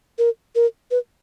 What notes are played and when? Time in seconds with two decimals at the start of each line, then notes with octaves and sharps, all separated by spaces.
0.18 A#4
0.55 A#4
0.91 B4